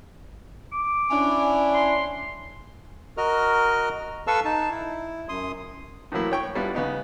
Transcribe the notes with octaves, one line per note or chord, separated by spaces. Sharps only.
D6
C#4 D4 E4
C6
F#4 A#4 D#5 F6
A4 B4 F5 A5 C#6 E6
D#4 A5
E4
F#2 C6 D#6
A2 E3 F#3 A#3 E4
C#5 G5 C#6
G3 B3 D4 E4 F4
C#3 B3 D#4